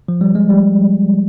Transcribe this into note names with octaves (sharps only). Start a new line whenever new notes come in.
F3
G3
G#3
G3